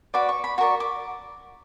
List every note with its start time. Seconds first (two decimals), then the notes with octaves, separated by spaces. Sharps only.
0.14 F#4 B4 D5 D6
0.29 C#6
0.44 B5
0.58 F#4 A#4 D5 C#6
0.80 D6